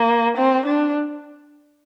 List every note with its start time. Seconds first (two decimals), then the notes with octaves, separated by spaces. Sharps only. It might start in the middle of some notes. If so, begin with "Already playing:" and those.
Already playing: A#3
0.37 C4
0.66 D4